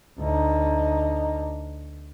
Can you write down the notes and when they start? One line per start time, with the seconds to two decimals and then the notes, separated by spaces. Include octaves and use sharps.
0.19 D2 D#4